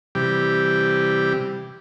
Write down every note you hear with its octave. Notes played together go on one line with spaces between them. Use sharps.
C3 E3 G3 G4